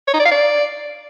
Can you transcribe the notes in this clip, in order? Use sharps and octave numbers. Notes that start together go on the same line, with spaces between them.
C#5
D#4
D5
F5
D5